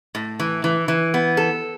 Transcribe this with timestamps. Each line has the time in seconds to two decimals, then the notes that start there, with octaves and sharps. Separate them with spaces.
0.15 A2
0.40 E3
0.64 E3
0.88 E3
1.14 B3
1.37 A4